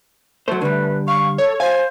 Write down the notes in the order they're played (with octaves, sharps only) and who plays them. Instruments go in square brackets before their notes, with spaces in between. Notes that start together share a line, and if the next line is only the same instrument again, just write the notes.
[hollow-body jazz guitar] F#3 C5 [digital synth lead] A3
[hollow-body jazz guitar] D3 G3 [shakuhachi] B4
[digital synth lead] F5 [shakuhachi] C#6
[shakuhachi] A4 [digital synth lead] C#5
[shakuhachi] C5 [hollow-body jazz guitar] F5 [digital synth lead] G#5